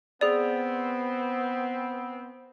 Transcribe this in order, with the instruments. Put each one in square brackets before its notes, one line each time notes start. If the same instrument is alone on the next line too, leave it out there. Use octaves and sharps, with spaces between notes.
[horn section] B3 C4 [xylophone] G#4 D5